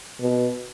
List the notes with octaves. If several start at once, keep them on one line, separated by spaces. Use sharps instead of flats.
B2